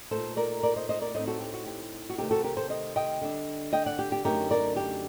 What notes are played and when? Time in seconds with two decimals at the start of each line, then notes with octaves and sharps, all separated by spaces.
0.11 A#2 A3 D#4 A4 C5
0.37 A#4 D5
0.63 A#4 D5
0.76 C5 D#5
0.89 C5 D#5
1.01 A#4 D5
1.15 A2 A3 C4 D#4 C5 D#5
1.27 F#4 A4
1.41 G4
1.53 F#4
1.66 G4
2.10 F#4
2.18 C3 D#3 A3 C4 D#4 G4
2.31 F#4 A4
2.44 G4 A#4
2.57 A4 C5
2.70 C5 D#5
2.96 D#5 G5
3.21 D3 G3 D4
3.73 D#5 G5
3.86 D5 F#5
3.99 G4
4.12 G4
4.24 F#2 D3 A3 D#4 G4 A#4
4.51 A#4 D5
4.76 G4